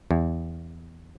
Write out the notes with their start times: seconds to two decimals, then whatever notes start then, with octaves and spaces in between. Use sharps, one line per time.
0.11 E2